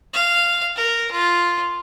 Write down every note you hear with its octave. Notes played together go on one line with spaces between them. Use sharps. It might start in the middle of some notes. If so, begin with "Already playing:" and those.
F5
A#4
F4